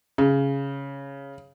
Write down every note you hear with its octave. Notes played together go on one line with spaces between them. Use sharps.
C#3